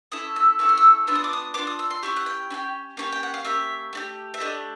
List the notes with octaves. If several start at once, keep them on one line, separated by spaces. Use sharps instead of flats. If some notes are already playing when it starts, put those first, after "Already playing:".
C#4 E4 A4 D#6
E6
C#4 E4 A4 E6
F6
E6
B3 D4 F4 E6
D#6
D6
D#6
B3 D4 F4 D6
D#6
E6
C6
C#4 E4 G4 C#6
F#5
G5
C#4 E4 G4
A#3 C#4 E4 G4
G5
F#5
F5
A#3 C#4 G4 E5
A3 D4 G4
E5
A3 D4 G4 D#5